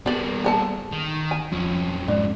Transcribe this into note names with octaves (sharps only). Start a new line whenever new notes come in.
G3 A#3 B3 G#4 D5
G#4 A4 A5
D#3
G#5
F2 F3 C#4
G#2 D4